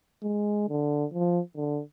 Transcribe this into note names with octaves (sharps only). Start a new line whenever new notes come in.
G#3
D3
F3
D3